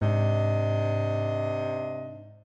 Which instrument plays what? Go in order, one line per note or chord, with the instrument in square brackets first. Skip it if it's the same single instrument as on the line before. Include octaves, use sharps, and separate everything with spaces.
[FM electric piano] G#2 [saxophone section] C3 D4 D#5